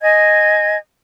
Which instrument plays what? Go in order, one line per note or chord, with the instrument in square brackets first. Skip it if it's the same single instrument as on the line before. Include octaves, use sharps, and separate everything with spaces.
[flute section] D#5 G#5 G#6